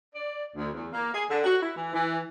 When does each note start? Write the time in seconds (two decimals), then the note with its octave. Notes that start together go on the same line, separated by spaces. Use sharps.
0.15 D5
0.56 D2
0.73 E2
0.92 A#3
1.13 G#4
1.29 D3
1.44 F#4
1.61 E4
1.76 E3
1.93 E3